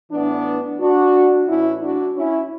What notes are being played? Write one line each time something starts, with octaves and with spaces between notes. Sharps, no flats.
A2 E3 B3 D4
D4 F#4
A2 E3 C#4 E4
D4 F#4
C#4 E4